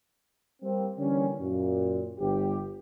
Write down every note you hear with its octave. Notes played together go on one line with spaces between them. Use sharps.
G3 A#3 C4
D3 E3 G3 A#3 C#4
F#2 A#2
G1 G4